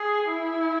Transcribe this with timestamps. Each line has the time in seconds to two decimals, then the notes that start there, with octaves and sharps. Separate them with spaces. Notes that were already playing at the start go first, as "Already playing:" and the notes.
Already playing: G#4
0.30 E4